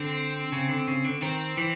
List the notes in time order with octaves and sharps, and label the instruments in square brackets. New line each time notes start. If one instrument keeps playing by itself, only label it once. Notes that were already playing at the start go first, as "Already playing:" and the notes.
Already playing: [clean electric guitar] D3 [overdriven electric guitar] C4
[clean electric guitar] C#3
D3
C#3
D3
[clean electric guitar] D#3 [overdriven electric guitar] C4
[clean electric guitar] E3